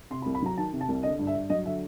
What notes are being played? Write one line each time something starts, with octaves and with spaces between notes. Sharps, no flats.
C3 C6
B5
C2
B5
F#3 A#5
D#3 A5
C3
A5
C2
D3 D#5
G2
E5
G2
F#3 D#5
D3 E5